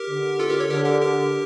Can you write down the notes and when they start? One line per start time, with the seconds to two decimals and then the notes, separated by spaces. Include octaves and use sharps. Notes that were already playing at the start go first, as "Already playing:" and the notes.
Already playing: G4 A#4
0.08 D3
0.40 F4 A4
0.50 G4 A#4
0.60 A4 C#5
0.70 D3 G4 A#4
0.85 G4 A#4
1.01 G4 A#4